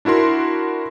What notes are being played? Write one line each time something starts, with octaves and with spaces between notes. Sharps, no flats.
D4 E4 F#4 A#4 C6